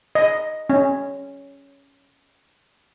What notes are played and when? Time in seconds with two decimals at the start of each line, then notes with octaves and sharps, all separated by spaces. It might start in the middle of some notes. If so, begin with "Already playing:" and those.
0.15 D#5
0.70 C#4